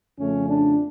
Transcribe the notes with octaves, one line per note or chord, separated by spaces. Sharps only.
F2 C#3 F3 A3 C#4
D4